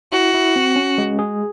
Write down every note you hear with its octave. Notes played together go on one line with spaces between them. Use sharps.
E4 F#4
E4
C4
C#4
G#3
G#4